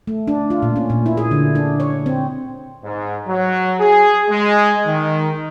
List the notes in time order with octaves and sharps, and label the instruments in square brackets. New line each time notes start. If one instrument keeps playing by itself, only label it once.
[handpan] A3
D4
F4
A#2
C#4
A#2
E4
G#4
D3
D4
C#5
C4
[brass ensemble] G#2
F#3
G#4
G#3
D#3